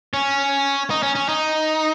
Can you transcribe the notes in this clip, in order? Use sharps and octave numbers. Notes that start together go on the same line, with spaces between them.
C#4
D#4
C#4
C#4
D#4